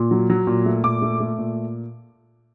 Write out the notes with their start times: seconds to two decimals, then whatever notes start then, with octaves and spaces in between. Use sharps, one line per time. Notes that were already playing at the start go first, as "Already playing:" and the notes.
Already playing: A#2
0.11 F#3
0.30 F#3
0.47 A#2
0.65 A3
0.84 A#2 D6
1.02 A3
1.20 A3
1.38 A#2